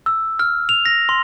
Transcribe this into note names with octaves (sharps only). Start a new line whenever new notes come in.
E6
F6
F7
A#6
C6